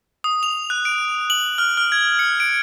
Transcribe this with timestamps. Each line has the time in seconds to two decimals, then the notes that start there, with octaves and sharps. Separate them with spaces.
0.24 D#6
0.43 F7
0.70 F#6
0.85 D7
1.30 F#7
1.58 F6
1.77 F6
1.92 G#6
2.19 C#7
2.40 D7